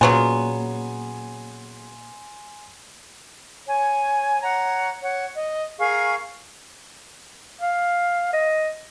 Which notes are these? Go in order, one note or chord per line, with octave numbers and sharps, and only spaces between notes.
A#2 C#3 F#3 B3 G#5 C6
C#5 G#5
C#5 F#5 A#5
C#5 F#5
D#5
G#4 A#4 F5 C#6
F5
D#5